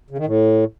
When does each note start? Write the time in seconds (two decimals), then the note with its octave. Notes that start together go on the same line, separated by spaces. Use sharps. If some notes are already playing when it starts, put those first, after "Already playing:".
0.10 C#3
0.18 D#3
0.26 A2